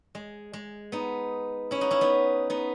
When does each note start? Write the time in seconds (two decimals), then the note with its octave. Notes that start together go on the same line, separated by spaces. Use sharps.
0.15 G#3
0.53 G#3
0.92 B3 D#4
1.71 C#4 E4
1.81 D#4 F#4
1.91 C#4 E4
2.01 B3 D#4
2.50 B3 D#4